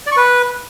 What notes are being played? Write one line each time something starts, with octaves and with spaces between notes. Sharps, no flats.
D5
C#6
B4